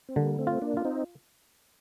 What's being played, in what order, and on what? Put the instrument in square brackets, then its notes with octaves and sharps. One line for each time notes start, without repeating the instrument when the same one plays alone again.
[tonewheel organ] C4
[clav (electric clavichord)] D3 [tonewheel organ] G3 A#3
[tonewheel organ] A3 C4
[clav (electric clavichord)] F4
[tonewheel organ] A#3 D4
[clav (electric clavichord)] F4
[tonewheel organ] C4 D#4